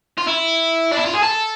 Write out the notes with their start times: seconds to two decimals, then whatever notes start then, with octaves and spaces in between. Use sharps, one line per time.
0.18 F4
0.27 E4
0.91 D4
0.97 E4
1.05 F4
1.14 G#4
1.23 A4